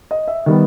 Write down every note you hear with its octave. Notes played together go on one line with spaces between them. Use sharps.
D#5
E5
D#3 G3 B3